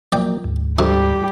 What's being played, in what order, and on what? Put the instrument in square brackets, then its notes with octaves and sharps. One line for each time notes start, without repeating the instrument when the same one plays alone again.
[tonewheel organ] F3 F#3 A#3 [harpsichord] D5 G5
[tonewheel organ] D2 G#2
[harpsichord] F2 D3 [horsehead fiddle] G3 G4